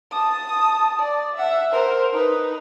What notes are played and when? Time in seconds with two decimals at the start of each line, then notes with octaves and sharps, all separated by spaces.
0.11 A5 D#6
1.00 D5
1.36 E5 F#5
1.72 A#4 C5
2.13 D#4 B4